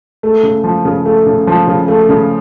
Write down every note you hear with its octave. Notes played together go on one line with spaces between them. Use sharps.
A3
C#3
F3
C#3
A3
C#3
F3
C#3
A3
C#3